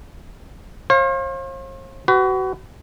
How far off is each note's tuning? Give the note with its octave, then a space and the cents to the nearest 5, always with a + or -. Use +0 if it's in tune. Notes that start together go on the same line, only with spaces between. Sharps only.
C5 +45 F5 +0
F#4 +30 B4 +30